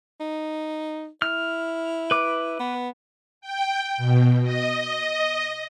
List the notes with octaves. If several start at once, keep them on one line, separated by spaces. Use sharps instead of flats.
D#4
E4 F6
B4 D6
B3
G5
B2
D#5